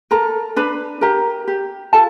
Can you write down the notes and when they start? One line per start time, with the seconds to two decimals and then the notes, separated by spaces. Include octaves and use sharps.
0.11 A4 A#4 A#5
0.56 D4 B4 B5
1.01 G4 A#4 A#5
1.48 G4
1.93 F4 A4 A5